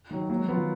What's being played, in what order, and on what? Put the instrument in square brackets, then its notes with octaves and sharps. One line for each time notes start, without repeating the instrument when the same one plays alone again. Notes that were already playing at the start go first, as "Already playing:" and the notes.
[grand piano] D#3 F#3
[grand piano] F#3 [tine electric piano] A#3
[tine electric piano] G#3
[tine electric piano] F3 [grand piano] B3 F4
[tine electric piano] D#3